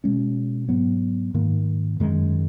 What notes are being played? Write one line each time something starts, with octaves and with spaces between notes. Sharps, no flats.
B2 G#3 C#4
G#2 F#3 B3
G#2 D#3 A#3
F#2 D#3 G#3